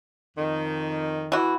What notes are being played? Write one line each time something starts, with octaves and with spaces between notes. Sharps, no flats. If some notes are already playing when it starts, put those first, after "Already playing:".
F2 D#3
E3 F#4